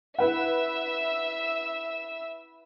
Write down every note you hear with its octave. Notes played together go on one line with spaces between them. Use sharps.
E4 B4 E5 F#5 E6